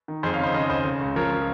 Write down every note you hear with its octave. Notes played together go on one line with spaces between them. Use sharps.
D#3
F2 G#4 C5
C#5 F5
C#3 C5 D#5
C#3 C5 D#5
F1 C5 D#5
C#3
C#2
F3 A#4 C#5
F3